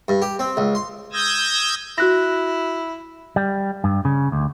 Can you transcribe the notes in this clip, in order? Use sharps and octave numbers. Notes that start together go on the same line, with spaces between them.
G2
G4
C4
C#2
C6
D#6 E6 G6 G#6 A#6
E4 F#4 F#6 A#6
G3
G2
C#3
D2